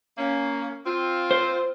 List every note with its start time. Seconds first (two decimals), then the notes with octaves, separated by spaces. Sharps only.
0.18 A#3 C#4
0.86 C4 F4
1.31 C5